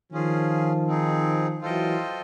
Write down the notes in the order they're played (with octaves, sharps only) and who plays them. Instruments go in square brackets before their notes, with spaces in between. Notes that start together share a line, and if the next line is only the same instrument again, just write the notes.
[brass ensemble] D#3 F3 [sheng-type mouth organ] C#4 F4 G#4
[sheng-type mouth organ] C4 D#4 G#4
[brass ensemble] E3 F#3 [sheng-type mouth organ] F4 A4 C5 D#5 G5